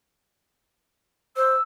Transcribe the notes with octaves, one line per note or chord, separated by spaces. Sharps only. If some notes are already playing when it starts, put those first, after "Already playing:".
C5 E6